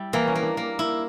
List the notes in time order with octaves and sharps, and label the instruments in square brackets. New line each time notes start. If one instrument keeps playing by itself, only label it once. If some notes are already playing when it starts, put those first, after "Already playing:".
Already playing: [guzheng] G3 E4
[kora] E3 [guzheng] A#3
[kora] C#4
[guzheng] A#3
[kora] D4
[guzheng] A#3
E4